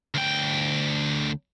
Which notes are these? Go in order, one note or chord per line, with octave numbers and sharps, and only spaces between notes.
D2 G5